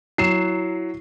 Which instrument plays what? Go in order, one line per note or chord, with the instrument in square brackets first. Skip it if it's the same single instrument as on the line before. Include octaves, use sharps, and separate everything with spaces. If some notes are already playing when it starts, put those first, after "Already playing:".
[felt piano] F#3 [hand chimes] E4 [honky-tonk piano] C7 E7